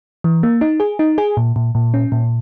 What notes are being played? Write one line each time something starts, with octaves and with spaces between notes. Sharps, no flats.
E3
A#3
D#4
G#4
D#4
G#4
A#2
A#2
A#2
C#4
A#2